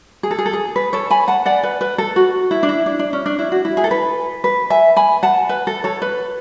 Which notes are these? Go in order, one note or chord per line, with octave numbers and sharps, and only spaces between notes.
G#4
A4
G#4
A4
G#4
B4
A4 C#5
G#5 B5
F#5 A5
D5 F#5
B4
B4
A4
F#4
E4
D4
E4
D4
D4
C#4
D4
E4
F#4
E4
G#4
A4
B4
B4
E5 G#5
G#5 B5
F#5 A5
B4
A4
A4 C#5
B4